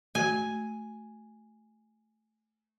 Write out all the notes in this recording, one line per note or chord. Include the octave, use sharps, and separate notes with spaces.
A3 F#4 G#5